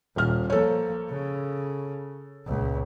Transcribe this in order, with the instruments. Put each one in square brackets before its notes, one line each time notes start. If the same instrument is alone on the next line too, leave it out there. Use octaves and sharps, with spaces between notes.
[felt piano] D#1 F6 [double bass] A#2
[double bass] F3 A#3 [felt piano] A4 C#5
[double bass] C#3
C#2 A#2